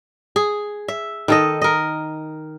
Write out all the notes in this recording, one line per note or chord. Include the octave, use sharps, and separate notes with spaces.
G#4
E5
D#3 A4 D#5
A#4 D#5